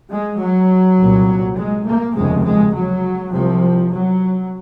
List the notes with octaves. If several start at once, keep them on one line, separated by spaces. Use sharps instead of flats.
G#3
F#3
C2 A#2
G#3
A#3
F1 D#2 C#3 G#3
G#3
F#3
C2 C3 F3
F#3